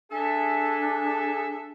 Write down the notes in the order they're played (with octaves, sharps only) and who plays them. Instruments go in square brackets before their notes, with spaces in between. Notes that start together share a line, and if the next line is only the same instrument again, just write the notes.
[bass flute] D4 [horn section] G#4 A4 E5